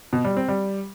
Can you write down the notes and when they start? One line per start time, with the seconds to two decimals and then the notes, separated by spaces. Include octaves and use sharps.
0.13 B2
0.25 G3
0.37 C4
0.49 G3